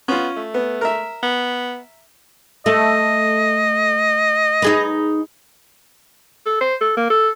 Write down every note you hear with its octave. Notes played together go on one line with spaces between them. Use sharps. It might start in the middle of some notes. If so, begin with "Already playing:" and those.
B3 C#4 F4
A3
B3
A#4 E5
B3
A3 D#5
D#4 G#4 B4
A4
C5
A4
A#3
A4